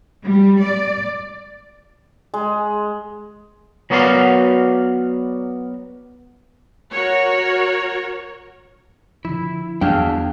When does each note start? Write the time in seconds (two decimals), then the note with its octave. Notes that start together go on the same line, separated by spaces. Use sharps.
0.23 G3
0.63 D5
2.34 G#3
3.90 F#3 B3 F#4 A#4 D5 F5
6.92 F#4 A#4 C#5
9.25 D3 F3 E4
9.81 E2 D4 F#4 G#4 F5 G5